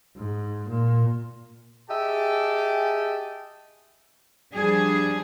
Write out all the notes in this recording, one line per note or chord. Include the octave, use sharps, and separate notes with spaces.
G#2
A#2
G4 G#4 D#5 E5 G5 A5
F3 G3 D4 G#4